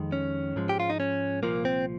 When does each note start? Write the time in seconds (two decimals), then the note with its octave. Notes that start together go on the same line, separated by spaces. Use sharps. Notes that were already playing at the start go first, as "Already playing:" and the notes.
Already playing: F2 D#3 G#3
0.12 C#4
0.56 G#2 F3 G#3
0.69 G4
0.80 F4
0.90 D#4
1.00 C#4
1.43 C2 A#2 F3 A#3
1.65 C4